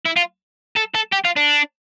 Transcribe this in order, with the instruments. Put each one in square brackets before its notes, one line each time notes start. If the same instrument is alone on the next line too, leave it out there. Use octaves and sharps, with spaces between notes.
[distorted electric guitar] E4
F4
A4
A4
G4
F4
D4